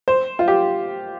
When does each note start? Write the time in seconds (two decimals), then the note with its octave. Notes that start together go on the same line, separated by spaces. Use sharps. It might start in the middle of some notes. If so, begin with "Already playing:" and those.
0.08 C5
0.39 F4
0.48 G4